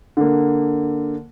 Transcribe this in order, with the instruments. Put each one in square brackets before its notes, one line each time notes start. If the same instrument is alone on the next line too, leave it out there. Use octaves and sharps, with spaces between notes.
[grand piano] D3 A#3